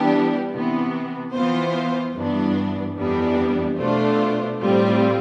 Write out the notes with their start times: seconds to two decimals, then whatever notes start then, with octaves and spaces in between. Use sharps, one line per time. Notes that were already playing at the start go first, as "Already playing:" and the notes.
Already playing: E3 G3 B3 D4 G4
0.52 C3 E3 B3
1.33 E3 B3 F4 C5
2.14 G2 E3 B3 D4
2.97 F2 E3 G3 B3 D4
3.78 B2 A3 D4 F4 C5
4.59 A2 G3 C4 F4